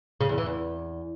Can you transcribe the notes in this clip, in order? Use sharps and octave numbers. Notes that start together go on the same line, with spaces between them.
C#3
E2
E3
E2